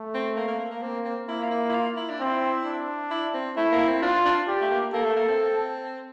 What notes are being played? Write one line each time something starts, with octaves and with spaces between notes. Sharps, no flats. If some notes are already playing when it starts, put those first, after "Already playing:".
Already playing: A3
C4
A#3
A#3
A#3
A#3
A#3 C4
C4
A#3 E4
F4
E4
E4
F4
E4
D4
C4 E4
D4
E4
C4
A3 E4
A#3
C4
D4 F4
D4
G4
A3
A#3
A#3 A4
A3
A#3
C4